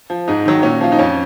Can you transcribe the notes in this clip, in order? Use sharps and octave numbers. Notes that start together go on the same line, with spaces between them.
F3
G#2 D#4
D#3 F#3
A#2 C#4
F3 F4
D#4
F2 C#4